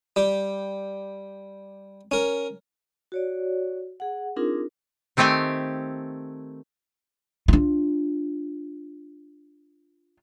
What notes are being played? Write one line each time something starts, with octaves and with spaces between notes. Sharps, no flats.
G3 G4
C#4 A#4
F#4 C#5 D5
G#4 F#5
C4 D4 D#4 F4 G#4 A#4
D#3 A3 C4 G4 G#5
D4 F4